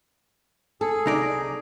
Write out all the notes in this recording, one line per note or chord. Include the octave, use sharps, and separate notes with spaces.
G#4 A4
C2 D#4 D5